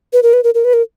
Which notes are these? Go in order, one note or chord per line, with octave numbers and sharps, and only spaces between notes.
B4
A#4
B4
A#4
A#4
B4
A#4